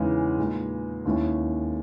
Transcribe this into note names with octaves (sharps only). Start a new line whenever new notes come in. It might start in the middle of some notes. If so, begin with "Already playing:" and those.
Already playing: E2 C#3 E3 G#3 D#4
A#2 G#3 D#4
D#2 D#3 G#3 C#4 E4